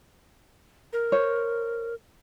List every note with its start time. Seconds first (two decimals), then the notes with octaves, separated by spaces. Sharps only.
0.93 A#4
1.12 C5 C#5